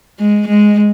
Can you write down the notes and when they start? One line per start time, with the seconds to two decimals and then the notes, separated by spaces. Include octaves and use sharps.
0.19 G#3
0.48 G#3